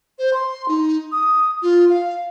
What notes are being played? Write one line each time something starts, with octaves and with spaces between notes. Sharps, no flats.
C5
C6
D#4
D#6
F4
F5